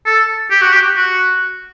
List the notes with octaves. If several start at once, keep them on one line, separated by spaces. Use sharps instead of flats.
A4
G4
F#4
G4
F#4